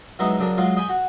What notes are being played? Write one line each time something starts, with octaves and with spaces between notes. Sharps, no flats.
F#3 G#3 B3 D#4 E4
C#3 F#3 D4 A#4
F#3 G#3 F4
D#5 G5 G#5 B5
F#4